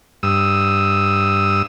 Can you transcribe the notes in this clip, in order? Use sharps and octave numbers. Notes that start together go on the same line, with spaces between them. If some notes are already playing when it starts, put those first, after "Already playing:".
G2 D#6 E6